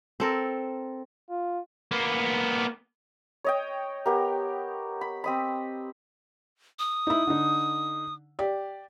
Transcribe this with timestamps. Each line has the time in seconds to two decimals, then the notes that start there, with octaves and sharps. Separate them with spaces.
0.20 C4 A4 A#4
1.30 F4
1.91 A#3 B3
3.44 C#5 D#5 G5
4.06 B3 G4 A#4
5.01 B5
5.24 C4 D#5 B5
6.79 D#6
7.07 D#4 E4
7.27 D3 D#4
8.39 G4 D5